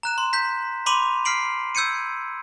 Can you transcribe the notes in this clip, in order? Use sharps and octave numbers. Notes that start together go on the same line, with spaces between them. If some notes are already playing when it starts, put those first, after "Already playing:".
A#5 F#6 E7
C6
G6 B6
B5 C6 D6 D#7 F7
F6 B6 C7 D7 F#7
E6 G6 G#6 C#7 D#7